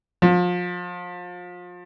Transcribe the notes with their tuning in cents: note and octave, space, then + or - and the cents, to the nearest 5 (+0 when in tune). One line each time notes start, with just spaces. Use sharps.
F3 +30